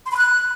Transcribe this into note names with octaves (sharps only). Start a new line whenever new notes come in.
C6
B5
F#6